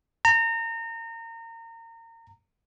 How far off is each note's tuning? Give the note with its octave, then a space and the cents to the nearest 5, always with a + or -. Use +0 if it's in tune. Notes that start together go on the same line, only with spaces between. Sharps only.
A#5 -30